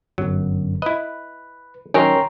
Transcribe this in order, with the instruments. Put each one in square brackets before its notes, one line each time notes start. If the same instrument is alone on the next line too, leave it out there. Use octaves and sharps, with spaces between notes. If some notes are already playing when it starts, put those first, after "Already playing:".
[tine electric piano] G1 F#2 [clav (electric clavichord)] F#3
[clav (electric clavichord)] E4 D#5 [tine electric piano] B4
[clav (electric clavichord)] D#3 F#3 A#4 [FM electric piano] C#4 [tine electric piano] G5 A#5 C6